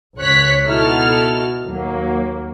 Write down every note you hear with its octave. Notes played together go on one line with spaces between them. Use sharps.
C#2 C#5 F#6 B6
B2 D#4 E4 F#4 A4 F6
D#2 F#3 A#3